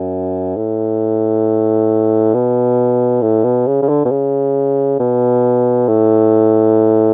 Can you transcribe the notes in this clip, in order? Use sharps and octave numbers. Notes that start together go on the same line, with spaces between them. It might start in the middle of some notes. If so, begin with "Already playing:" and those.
Already playing: F#2
A2
B2
A2
B2
C#3
C#3
D3
B2
C#3
B2
A2